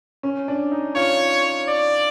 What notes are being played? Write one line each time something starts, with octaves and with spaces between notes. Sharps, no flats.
C#4
D4
D#4
F4 C#5
D5